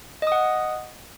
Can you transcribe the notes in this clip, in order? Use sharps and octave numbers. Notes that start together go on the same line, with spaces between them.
D#5 F#5 D#6